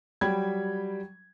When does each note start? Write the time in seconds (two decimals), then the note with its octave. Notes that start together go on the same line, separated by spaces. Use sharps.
0.21 F#3 G3 G5 B5 G#6